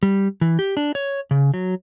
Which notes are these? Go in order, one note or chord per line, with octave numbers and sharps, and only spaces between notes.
G3
E3
G4
D4
C#5
C#3
F#3